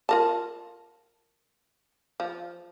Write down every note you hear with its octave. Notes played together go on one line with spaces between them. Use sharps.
F4 A#4 A5
F3